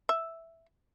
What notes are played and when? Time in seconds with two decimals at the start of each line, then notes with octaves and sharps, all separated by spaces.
0.09 E5